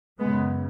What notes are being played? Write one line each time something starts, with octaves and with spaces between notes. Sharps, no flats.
F#2 C#3 G#3 B3